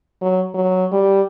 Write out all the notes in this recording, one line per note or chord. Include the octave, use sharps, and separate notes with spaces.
F#3
F#3
G3